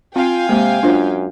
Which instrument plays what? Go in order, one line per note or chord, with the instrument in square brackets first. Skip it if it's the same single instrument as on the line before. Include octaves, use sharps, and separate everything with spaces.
[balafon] C4 [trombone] F4 [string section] F5 G5 G#5
[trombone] C3 [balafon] G#3 A#3
[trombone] F#2 [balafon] D4 F4 C5